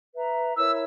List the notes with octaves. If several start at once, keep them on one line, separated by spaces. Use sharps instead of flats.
B4 E5 A#5
E4 A#4 C#5 E5 E6